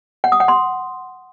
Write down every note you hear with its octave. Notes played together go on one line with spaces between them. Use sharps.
F#5
D#6
F#5
C6